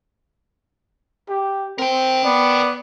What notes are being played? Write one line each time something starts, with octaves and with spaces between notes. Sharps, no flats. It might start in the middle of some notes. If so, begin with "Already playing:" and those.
G4
C4 A#4 G5
B3 D5